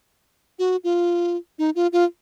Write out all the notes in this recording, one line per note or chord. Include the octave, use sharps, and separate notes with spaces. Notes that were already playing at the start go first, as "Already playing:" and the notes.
F#4
F4
D#4
F4
F4